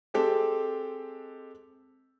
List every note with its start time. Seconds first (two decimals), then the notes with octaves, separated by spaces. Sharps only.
0.14 G#3 C4 G4 A4